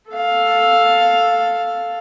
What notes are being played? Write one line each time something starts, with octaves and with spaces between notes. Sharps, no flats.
A4 F5